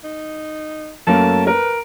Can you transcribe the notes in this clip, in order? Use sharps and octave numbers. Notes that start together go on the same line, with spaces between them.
D#4
F#2 A3 A#3 A5
A#4 B4